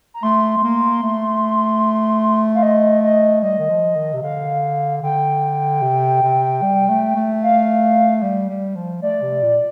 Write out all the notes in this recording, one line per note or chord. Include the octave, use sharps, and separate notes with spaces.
A#5
A3 C6
A3
A#3
A3
F5
D#5
D#5
G3 D#5
D#3
F3
D#3
C3
D3 F5
D3 G5
C3
C3
G3
A3
A3
F5
G3
G3
F3
A3 D5
C3
A#2